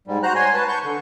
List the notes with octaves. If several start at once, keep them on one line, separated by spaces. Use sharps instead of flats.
G#2 G3
F#4 C5 A#5 F#6
C#5 G#5 C6
B4 A5
C#6 G6
D3